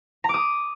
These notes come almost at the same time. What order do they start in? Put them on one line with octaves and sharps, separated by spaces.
A#5 D6 D#6